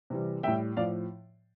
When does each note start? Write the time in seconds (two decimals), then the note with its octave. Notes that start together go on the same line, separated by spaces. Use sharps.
0.10 C3 E3 G3
0.43 A2 G3 E5 G5
0.77 A2 F3 D5 F5